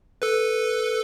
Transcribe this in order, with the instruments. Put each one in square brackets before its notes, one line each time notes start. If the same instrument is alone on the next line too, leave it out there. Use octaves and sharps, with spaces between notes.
[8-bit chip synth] A4 B4